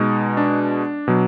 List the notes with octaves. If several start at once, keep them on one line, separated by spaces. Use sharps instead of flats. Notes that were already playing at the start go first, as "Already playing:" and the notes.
Already playing: B2 G#3 D#4
D4
B2 F#3